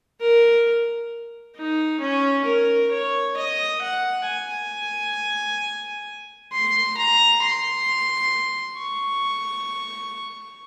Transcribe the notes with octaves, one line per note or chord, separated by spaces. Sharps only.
A#4
D#4
C#4
A#4
C#5
D#5
F#5
G#5
C6
A#5
C6
C#6